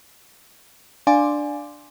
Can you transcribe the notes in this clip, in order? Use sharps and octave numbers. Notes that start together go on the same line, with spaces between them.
D4 D5 F5 G#5 C6 D6